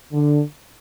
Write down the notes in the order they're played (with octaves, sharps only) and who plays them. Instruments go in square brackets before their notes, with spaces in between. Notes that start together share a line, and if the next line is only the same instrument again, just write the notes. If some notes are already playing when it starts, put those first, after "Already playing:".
[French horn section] D3